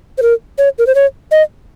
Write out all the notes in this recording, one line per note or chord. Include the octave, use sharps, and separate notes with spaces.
C5
A#4
C#5
A#4
C5
C#5
D#5